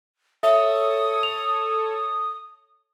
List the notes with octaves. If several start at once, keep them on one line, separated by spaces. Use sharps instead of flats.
A4 C#5 E5 D#6
F7